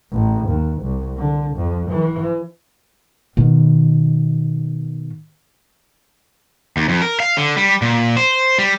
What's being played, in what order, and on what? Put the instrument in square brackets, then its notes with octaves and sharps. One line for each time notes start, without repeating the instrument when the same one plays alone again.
[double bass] A1
D#2
C2
D3
F2
E3
[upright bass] B2 D#3
[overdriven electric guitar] D#2
F2
A#4
F5
D3
G3
A#2
C5
G3